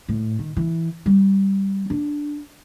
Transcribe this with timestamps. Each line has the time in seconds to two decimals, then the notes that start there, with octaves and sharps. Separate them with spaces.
0.08 A2
0.39 D#3
0.57 E3
1.06 G3
1.90 D4